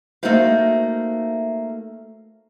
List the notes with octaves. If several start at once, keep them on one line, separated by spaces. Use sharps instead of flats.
A3 A#3 D#4 F#4 C5 F5